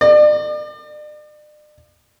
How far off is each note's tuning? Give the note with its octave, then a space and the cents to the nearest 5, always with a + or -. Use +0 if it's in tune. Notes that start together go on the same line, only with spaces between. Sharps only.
D5 +40